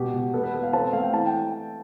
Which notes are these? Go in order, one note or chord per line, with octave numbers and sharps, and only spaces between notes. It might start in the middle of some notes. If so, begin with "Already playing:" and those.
Already playing: B2 G4
B2
B3 A4
B4
B3 A4
F5
C4 A5
A3 F5
G5
E3 A5
G5